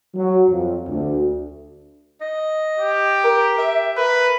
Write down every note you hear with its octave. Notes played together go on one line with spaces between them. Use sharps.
F#3
F2
D2
D#5
G4
A#4
E5
A#4 B4